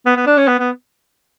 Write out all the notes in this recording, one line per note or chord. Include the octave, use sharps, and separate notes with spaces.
B3
B3
D4
C#4
B3
B3